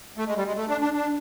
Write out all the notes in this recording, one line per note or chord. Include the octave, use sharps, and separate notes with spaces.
A3
G#3
G3
G#3
A3
D4
D4
D4